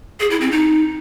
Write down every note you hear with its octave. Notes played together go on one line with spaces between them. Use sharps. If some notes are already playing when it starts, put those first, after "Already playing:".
G#4
E4
C4
D#4